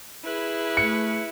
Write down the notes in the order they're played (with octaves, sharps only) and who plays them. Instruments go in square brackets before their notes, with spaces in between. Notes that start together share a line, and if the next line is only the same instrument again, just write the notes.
[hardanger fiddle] E4 [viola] G#4 B4
[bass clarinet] A3 [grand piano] C#7